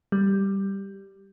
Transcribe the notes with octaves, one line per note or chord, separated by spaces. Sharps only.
G3